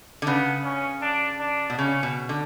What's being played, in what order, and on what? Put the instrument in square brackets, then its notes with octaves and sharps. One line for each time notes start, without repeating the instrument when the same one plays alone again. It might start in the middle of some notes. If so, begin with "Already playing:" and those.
[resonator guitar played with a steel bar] D3
[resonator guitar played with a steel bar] C#3 [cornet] B3
[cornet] C#4
D4
D4
[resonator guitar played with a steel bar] B2
[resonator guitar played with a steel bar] C#3 [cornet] C#4
[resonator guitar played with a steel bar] B2
D3